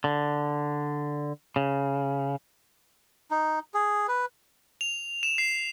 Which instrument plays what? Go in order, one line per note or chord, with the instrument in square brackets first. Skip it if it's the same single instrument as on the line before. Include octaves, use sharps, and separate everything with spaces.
[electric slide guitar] D3
C#3
[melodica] D#4
G#4
B4
[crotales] F7
E7
C7